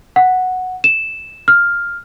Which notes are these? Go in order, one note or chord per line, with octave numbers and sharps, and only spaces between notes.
F#5
E7
F6